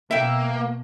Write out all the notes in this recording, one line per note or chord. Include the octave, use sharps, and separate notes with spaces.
B2 A#3 E5 G5